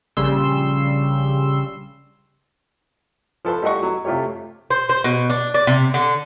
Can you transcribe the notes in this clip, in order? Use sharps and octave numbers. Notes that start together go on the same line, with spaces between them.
A#1 C#3 G3 C6 E6
F3 A4 B4 C6
G3 A3 E4 D#5 F#5 C#6
F#3
C3 A3 F4 G4 C#5
C5
C5
B2
D4
D5
C3
D3